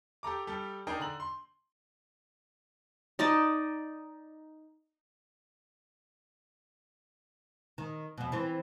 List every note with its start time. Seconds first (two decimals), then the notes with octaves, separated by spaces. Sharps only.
0.23 G4 A4 A#5 D6
0.47 G3 G4 A4
0.87 D4 D#4 G#4 A#4 D#5 G5
1.00 D3 A#5 F#7
1.20 C6
3.19 D#4 D5 D#5 A5
7.78 D#3
8.18 F2 B2
8.32 E3 C4